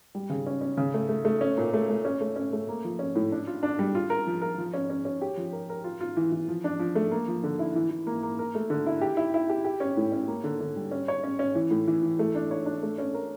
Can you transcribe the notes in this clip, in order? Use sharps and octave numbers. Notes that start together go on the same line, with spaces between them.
G3
C#3
C#4
C#4
C#3
A3
A3
A3
C#4
A#2
A3
A3
C#4
A3
C#4
A3
A#3
F3
C#4
A2
D4
F4
D4
G3
F4
A#4
F3
A#4
F3
C#4
C#4
C#4
G4
F3
A#4
A#4
F4
F4
E3
E3
F3
D4
F3
A3
A#3
F3
D3
E4
E3
E3
A#3
A#3
A#4
A3
D3
E4
G4
E4
E4
G4
G4
C#4
A2
C#4
A#3
D3
D3
G3
C#4
C#5
C#4
C#4
E3
A2
E3
E3
A3
D4
C#5
D4
A3
C#4
A#4